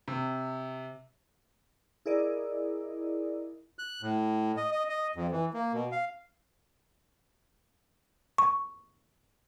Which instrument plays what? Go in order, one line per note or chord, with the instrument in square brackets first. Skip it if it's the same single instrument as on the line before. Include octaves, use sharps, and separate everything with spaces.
[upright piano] C3
[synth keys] E4 G#4 A#4 D5 D#5
[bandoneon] F#6
A2
D#5
D#5
D#5
F2
E3
A#3
B2
F5
[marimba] C#6